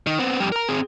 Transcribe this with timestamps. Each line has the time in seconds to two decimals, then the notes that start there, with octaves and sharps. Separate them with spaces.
0.07 D#3
0.19 B3 C4
0.40 F2 G3
0.52 A#4 A#5
0.68 C4 G#4